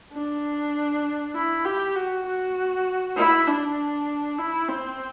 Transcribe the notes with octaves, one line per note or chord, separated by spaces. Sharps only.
D4
E4
G4
F#4
F#4
E4
D4
E4
C4